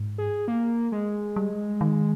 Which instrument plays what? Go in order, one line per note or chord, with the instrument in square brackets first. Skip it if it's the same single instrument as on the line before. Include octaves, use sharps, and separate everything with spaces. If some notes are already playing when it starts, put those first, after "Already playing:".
Already playing: [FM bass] G#2
[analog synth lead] G#4
A#3
G#3
[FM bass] G3
D#3